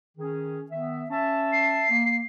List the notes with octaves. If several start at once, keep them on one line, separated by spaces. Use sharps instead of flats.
D#3 C#4 G#4
D#3 B3 E5
C#4 E5 A5
C7
A#3